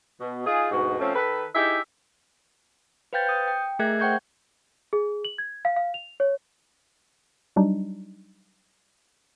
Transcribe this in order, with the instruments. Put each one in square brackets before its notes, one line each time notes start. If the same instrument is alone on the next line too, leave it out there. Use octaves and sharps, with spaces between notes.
[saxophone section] B2
D#4 F4 G#4
D2 G#2 B2 F#4
F3 A3 C4 C#4
D#3 A4 B4
D#4 E4 G4 G#4 E5
[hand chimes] B4 C5 F5 G5 G6 A6
D#6 G6
G5
A3 G#4 A#4 E5 F#6 G#6
C5 F#5 G5 C#6 G6 G#6
[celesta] G#4
F#7
G#6
F5
F5
F7
C#5
[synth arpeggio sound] F#3 G3 D4 D#4